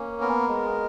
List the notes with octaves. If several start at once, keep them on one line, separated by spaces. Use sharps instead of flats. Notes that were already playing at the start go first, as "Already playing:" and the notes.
Already playing: A#3 C#4
B3 A#4
G#3